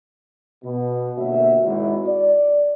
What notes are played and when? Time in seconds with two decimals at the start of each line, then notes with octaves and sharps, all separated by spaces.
0.64 B2
1.18 G1 B2 A#3 F#4 C#5 E5
1.64 G#1 E4 F#4
2.07 D5